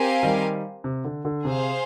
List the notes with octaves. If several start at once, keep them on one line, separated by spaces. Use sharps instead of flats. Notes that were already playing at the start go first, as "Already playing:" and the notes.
Already playing: C4 G4 A#4 F5 G#5
D#3 G3
C3
D3
D3
C3 G#4 C5 F5